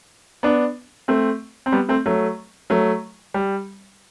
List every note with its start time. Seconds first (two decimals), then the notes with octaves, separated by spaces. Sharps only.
0.43 B3 D4
1.08 A3 C4
1.66 C4
1.72 G3 B3
1.89 A3 C4
2.06 F#3 A3
2.70 F#3 A3
3.34 G3